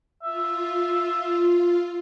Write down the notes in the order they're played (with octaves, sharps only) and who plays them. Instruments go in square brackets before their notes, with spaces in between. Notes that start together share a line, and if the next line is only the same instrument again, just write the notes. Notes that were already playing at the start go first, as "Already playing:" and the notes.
[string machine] F4 [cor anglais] E5